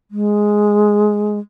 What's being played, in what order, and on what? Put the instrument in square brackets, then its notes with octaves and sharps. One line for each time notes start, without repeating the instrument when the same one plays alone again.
[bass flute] G#3